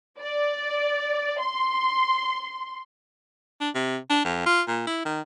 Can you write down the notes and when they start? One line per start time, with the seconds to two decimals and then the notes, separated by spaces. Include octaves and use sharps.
0.19 D5
1.40 C6
3.61 D4
3.75 C3
4.10 D4
4.24 F2
4.46 F4
4.68 A#2
4.87 E4
5.05 D#3